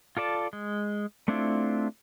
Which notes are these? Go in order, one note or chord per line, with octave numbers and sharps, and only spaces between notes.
F4 A4 D5 A5
G#3
A3 C4 D4 E4 F4